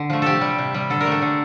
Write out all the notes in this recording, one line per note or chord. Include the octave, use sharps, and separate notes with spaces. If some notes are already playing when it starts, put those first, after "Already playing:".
Already playing: D3
F3 A3
C3 G4 A4
G3
C3
G3
D3 A4
A#4
A3
A4
D3